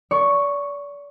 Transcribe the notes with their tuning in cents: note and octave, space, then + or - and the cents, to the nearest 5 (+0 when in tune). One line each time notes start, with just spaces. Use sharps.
D5 -35 C#6 +0